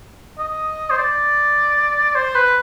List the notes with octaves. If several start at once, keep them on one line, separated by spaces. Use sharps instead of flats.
D#5
C5
D5
C5
B4